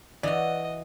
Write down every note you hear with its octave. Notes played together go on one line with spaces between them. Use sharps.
E3 F#4 D5 D#5